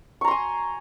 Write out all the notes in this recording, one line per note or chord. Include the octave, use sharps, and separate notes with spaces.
G#5 A#5 C6 C#6